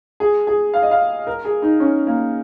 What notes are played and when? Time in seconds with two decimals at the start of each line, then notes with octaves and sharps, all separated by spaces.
0.20 G#4
0.47 G#4
0.74 F5
0.82 D#5
0.91 F5
1.27 A#4
1.45 G#4
1.62 D#4
1.80 C#4
2.07 A#3